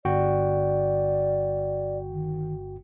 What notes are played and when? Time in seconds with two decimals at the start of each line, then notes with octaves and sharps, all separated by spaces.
0.05 G1 F#4 D5 G5
2.09 D#3